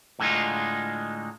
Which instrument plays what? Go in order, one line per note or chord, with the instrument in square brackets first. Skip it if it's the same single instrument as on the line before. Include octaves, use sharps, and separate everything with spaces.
[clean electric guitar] A2 D3 G#3 D#4 F4